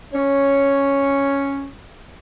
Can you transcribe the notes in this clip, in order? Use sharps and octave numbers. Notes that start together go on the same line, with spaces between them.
C#4 C#5